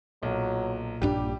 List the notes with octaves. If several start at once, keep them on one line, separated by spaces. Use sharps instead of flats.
B1 A#2 F#3
A#1 G2 G3 D4 G4